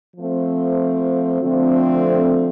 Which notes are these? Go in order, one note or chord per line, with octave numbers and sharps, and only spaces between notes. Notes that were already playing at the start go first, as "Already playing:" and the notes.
F3 A3 C4
D3 F3 A3 C4